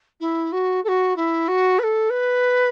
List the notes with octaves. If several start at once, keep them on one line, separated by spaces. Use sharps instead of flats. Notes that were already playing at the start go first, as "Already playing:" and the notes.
E4
F#4
A4
F#4
E4
F#4
B4
A4
B4